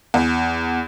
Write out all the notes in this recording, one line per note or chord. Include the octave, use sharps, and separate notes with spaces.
E2